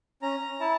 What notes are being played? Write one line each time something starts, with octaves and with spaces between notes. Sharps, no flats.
C#4 A#5
E4 A5